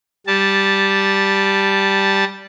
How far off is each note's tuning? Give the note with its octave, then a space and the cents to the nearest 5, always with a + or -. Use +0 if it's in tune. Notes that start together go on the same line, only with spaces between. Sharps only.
G3 +0 A5 -5